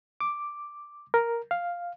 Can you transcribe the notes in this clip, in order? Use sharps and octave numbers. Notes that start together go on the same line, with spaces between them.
D6
A#4
F5